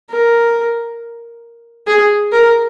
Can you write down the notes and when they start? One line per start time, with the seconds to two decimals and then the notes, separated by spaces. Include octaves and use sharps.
0.10 A#4
1.87 G#4
2.32 A#4